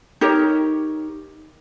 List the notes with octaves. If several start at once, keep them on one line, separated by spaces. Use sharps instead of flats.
D#4 G4 A#4 C#5